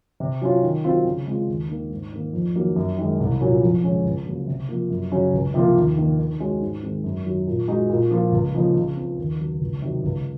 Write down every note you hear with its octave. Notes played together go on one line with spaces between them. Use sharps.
C3
F#3 C#4 F4
D#3
F#3 C4 F4
C#3
G#3 C4 F4
D#2
D#3 A#3
G#2
D#3 A#3
F2
D#3 F#3 A#3
F#2
D#3 G#3
C2
A#2 F#3 C#4
F2
C#3 G#3 C#4
C#2
C#3 F#3 A#3
C3
F3 A#3
F#2
C#3 F#3 C#4
C#2
C3 F3 A#3 F4
D#2
D#3 A#3
D#3
G#3 C#4 F#4
G#2
D#3 G#3 C4
F#2
D#3 F#3
A#2
G#3 D#4 F#4
A#2
F3 A#3 F4
C#2
C#3 F3 A#3 D#4
C#3
F3 C4
D#2
C#3 F#3
C#2
C3 D#3 F#3
C#2